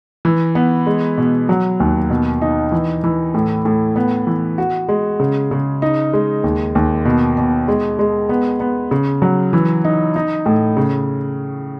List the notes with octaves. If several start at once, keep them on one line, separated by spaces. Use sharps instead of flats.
E3
B3
G#3
B2
F#3
D#2
B2
D#4
E3
E3
A2
A2
B3
E3
F#4
G#3
C#3
C#3
D#4
G#3
D#2
D#2
B2
B2
G#3
G#3
B3
B3
C#3
F#3
E3
D#4
D#4
A2
C#3